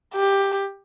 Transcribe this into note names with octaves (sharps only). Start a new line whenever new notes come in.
G4